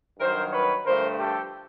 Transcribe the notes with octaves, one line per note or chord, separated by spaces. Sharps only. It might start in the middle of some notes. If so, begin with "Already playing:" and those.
G2 D#3 F#3 A#4 C5
B4 C#5
G2 D3 F3 A3 A#4 C5
G4 A4